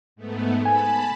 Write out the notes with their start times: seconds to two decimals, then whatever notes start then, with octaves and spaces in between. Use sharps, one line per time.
0.16 G#2 A3 B3
0.65 G#5 A5 B5